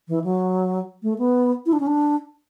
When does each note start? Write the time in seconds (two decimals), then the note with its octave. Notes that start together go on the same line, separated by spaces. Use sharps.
0.08 E3
0.24 F#3
1.03 A3
1.18 B3
1.66 E4
1.73 D4
1.80 C#4
1.87 D4